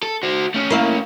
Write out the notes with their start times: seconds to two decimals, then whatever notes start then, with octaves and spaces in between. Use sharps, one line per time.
0.03 A4
0.23 F#4 C5
0.54 A3 C#4
0.70 A#3 E4 F5